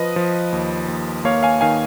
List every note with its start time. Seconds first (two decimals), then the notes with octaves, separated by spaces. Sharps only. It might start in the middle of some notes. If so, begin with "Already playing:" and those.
Already playing: F3 B4 D#5
0.16 F3
0.52 D#2
0.88 D#2
1.25 A#3 C#5 F5
1.43 F5 G#5
1.61 D#3 F5 G#5